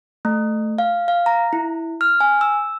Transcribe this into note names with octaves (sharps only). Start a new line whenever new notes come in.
A3
F5
F5
A#5
E4
F6
G#5
E6